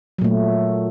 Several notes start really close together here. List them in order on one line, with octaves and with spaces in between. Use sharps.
F#3 A#2 A3